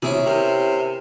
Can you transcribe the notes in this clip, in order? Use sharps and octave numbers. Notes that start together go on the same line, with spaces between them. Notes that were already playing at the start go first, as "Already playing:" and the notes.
C3 C#4 E4 G#4
C3 A#4